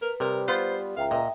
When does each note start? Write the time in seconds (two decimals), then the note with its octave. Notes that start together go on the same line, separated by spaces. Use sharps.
0.02 A#4 B4
0.20 C3 G3 A#4
0.48 B3 F4 C5
0.97 C#2 E5 F5 G5 A#5
1.11 A#2 D#5